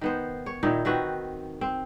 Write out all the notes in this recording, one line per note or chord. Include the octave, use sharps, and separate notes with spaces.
D#3 B3 C5
C#5
A#2 D#3 D#4 E4
D#3 C4 F#4 B4
C4